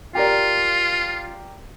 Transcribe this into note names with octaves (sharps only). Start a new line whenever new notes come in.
F4 G4 A#4 D5